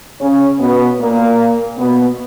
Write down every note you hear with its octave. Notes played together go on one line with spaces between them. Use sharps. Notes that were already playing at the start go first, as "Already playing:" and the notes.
C#3 C#4
B2 B3
A#2 A#3
B2 B3